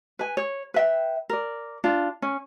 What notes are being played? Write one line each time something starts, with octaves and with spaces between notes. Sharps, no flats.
B4 G#5
C#5
B4 E5 G5
A#4 D5
D4 F4
C#4